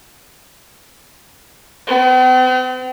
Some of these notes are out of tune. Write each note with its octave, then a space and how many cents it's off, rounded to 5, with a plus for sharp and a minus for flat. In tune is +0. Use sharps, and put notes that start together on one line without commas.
C4 -45